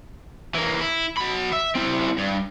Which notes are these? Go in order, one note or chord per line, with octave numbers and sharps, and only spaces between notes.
E3 A#3
E4
F#3 B5
E5
C4 E4
G2